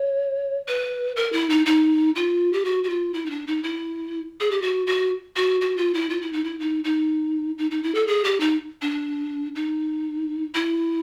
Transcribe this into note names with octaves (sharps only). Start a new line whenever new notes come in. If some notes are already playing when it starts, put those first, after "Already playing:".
Already playing: C#5
B4
A#4
E4
D#4
D#4
F4
G4
F#4
F#4
F4
E4
D#4
D4
D#4
E4
G#4
G4
F#4
F#4
F#4
F#4
F4
E4
F4
E4
D#4
E4
D#4
D#4
D#4
D#4
E4
A4
G#4
G4
D#4
D4
D#4
E4